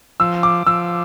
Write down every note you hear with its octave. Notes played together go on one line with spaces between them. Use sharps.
F3 E6
D6
F3 E6